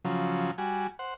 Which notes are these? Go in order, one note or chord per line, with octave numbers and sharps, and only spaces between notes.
C#3 F3 F#3
G3 F#4 G#5
C5 F#5